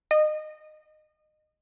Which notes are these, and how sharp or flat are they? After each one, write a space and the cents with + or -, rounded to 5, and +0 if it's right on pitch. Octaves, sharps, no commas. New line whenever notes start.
D#5 -20